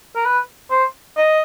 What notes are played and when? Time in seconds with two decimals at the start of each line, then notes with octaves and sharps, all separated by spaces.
0.16 A#4
0.25 B4
0.70 C5
1.17 D#5